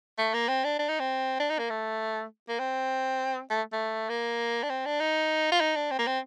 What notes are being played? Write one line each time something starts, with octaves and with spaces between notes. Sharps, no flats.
A3
A#3
C4
D4
D4
D#4
C4
D4
D#4
A#3
A3
A#3
C4
A3
A3
A#3
D4
C4
D4
D#4
F4
D#4
D4
C4
A#3
C4